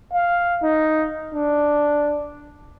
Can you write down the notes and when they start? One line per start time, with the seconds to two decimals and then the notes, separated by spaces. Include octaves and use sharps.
0.13 F5
0.62 D#4
1.34 D4